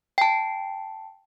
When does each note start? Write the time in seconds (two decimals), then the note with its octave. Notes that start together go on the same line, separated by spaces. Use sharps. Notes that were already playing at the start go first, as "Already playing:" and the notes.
0.18 G5 A5